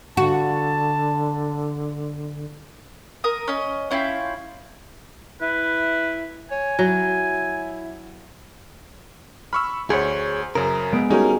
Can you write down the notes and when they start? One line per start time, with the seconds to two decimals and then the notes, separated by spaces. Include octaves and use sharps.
0.17 D3 F#4 A5
3.24 A#4 D#6
3.48 C#4 D#5
3.91 C#4 E4 F4 G5
5.42 E4 B4
6.51 C#5 G#5
6.79 F#3 E4
9.53 B5 C#6 E6 F6
9.90 D2 G#4 C5 C#5 B6 C#7
10.55 F#2 C#3 A#4
10.92 G#3 B3 D7
11.10 G3 C#4 D#4 F#4 G#4 A#4